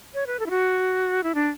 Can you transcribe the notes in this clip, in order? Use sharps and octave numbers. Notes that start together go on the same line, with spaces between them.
C#5
B4
A4
E4
F#4
E4
D4